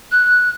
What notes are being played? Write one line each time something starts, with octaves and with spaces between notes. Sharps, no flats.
F#6